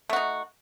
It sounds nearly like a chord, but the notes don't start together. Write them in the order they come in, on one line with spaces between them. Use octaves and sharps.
A3 F#4 D#4